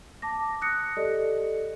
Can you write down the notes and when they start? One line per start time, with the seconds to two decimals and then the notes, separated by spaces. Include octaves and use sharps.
0.22 A5 D6 A#6
0.61 D#6 F#6 A#6 C#7
0.97 G4 A4 D5 D#5